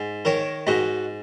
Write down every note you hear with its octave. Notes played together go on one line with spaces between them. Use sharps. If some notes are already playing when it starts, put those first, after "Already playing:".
Already playing: G#2
D#3 A#4 C#5
G#2 D#4 F#4